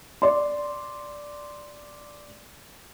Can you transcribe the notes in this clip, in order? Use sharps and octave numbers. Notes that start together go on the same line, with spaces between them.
D5 C6